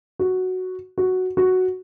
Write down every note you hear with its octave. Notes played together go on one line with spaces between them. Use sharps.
F#4
F#4
F#4